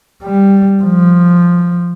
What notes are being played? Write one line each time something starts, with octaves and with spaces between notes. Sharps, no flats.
G3
F3